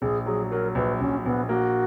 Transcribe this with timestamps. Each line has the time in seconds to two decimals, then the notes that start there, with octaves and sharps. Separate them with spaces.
0.02 A#1 G#4
0.26 F#3 G#4
0.51 F#3 A#4
0.75 A#1 B4
1.00 A#1 C#4
1.25 A#1 B3
1.49 A#3 F#4